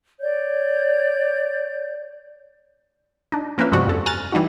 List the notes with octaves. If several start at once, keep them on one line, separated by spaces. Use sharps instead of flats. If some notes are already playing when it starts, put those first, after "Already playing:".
C#5 D5 G6
D4 D#4
F3 A#3 C#4 B4 E5
G2 C3 F3 G#3 F#4 D5
F2 A4
G#5 A#5 F6 F#6 A6
E3 G3 D#4 F#4